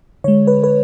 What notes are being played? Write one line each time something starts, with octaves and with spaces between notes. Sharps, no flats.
D3 G#3 C#5
B4
B4